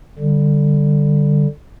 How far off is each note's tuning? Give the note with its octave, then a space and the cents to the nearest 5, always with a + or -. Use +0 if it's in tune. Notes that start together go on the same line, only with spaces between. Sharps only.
D3 +5 G3 +5